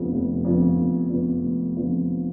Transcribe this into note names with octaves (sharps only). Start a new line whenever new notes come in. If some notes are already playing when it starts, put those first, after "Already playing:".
Already playing: F1 F2 D3 F3 B3
F1
F2 D3 F3 B3
F1
F2 D3 F3 B3
F1
F2 D3 F3 B3